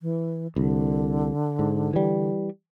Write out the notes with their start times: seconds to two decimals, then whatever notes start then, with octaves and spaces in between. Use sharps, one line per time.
0.02 E3
0.56 C2 D3
1.59 G#2
1.93 E3 G3